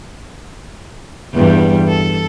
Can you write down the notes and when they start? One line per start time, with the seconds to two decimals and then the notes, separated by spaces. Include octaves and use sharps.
1.34 E2 G2 G3
1.88 A4